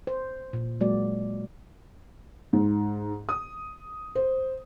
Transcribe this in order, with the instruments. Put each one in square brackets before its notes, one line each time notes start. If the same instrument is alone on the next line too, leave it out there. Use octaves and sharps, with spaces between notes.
[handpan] C5
A#2
F#3 G#3 A#3 F#4 D5
[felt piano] G#2
D#6
C5